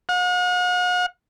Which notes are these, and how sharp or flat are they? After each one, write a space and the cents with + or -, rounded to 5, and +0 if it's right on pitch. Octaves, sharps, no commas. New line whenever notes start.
F#5 -45